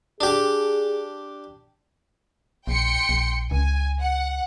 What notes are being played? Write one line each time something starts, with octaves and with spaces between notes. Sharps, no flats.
D4 G4 G#4
A#1 G5 C6 C#7
A#1
C#2 G#5
F#5